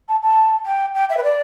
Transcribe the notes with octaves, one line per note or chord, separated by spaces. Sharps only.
A5
A5
G5
G5
E5
B4
D5